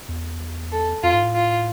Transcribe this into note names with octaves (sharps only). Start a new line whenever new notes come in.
E2
A4
F2 F4
G#2
A2
F4